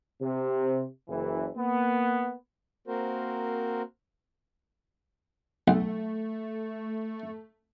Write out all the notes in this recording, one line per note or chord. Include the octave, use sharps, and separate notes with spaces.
C3
F#1 E3
A#3 B3
A#3 C4 F#4 A#4 C5
B1 A3